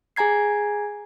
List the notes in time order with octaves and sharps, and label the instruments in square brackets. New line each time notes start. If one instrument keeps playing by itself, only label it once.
[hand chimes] G#4 G#5 A#5 G#6 C7